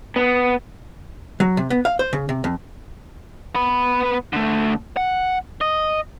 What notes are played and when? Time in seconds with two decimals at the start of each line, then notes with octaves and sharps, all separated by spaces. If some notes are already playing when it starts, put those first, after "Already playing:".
0.16 B3
1.40 F#3
1.57 C3
1.70 B3
1.85 F5
1.99 C5
2.13 C#3
2.29 C3
2.44 F2
3.55 B3 B4
4.33 D3 A3
4.97 F#5
5.61 D#5